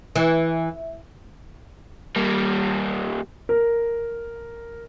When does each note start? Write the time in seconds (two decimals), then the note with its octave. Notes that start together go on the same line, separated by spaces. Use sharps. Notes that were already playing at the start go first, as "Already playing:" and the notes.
0.16 E3
2.16 G3 A#3
3.49 A#4